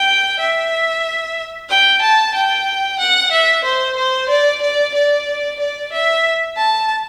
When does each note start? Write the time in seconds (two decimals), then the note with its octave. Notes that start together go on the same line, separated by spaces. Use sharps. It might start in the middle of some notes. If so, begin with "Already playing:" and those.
Already playing: G5
0.39 E5
1.69 G5
2.01 A5
2.34 G5
2.99 F#5
3.31 E5
3.64 C5
3.97 C5
4.29 D5
4.62 D5
4.94 D5
5.59 D5
5.92 E5
6.57 A5